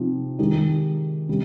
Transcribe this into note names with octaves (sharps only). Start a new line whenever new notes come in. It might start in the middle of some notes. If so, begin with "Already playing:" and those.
Already playing: C3 F3 C4 D#4 G4
D#3 G#3 D#4 G4
C3 G3